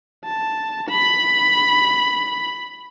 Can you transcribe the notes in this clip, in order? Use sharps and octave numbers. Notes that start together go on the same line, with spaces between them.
A5
B5